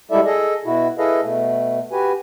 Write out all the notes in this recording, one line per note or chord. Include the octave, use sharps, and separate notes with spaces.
G3 G#3 E4 A4 D5 E5
G#4 A4 D#5
B2 E4 F#4
E4 G#4 A4 B4 D#5 F5
B2 A3
F#4 G4 B4 G#5